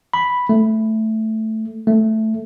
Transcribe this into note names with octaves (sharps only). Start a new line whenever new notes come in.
B5
A3
A3